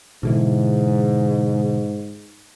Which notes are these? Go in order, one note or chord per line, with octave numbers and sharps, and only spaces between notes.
G#2 B2 D3 E3